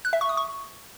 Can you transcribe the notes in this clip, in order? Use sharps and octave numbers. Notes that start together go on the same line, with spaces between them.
F#6
E5
C#6
D#6
C#6